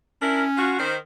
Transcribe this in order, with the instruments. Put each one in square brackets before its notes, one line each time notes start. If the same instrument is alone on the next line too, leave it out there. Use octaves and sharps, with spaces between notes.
[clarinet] C#4 [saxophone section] D4 E4 A#4
[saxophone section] F4 F#4
D#3 C5